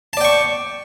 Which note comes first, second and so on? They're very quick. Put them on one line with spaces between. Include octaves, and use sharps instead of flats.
A5 D5 G5 C#6